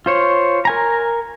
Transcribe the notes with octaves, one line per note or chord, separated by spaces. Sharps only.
F4 C5 C#5
A#4 G#5 A#5